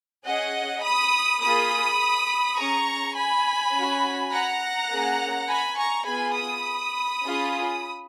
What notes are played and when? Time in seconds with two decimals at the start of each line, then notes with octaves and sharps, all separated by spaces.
0.24 C#4 G#4 D#5 F#5
0.81 B5 D#6
1.40 A#3 F4 G#4 B5 D#6
2.57 C#4 G#4 A#5 C#6
3.15 G#5 B5
3.73 C#4 F#4
4.31 F#5 A#5
4.89 A#3 C#4 G#4
5.48 G#5 B5
5.77 A#5 C#6
6.06 B3 F4 G#4 G#5 B5
6.35 B5 D#6
7.22 C#4 F4 G#4